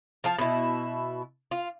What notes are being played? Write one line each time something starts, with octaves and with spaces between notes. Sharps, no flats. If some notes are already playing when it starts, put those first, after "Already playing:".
F3 F4 A5
B2 E4
F4